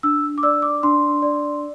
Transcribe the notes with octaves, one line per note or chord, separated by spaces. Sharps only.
D4 E6
D6
D5 E6
D6
D4 C6
D5